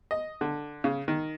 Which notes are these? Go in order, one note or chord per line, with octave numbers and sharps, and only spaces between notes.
D#5
D3
C#3
D#3